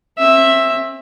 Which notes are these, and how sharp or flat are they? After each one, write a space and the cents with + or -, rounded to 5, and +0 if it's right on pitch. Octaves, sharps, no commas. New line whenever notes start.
C4 +40 E5 +0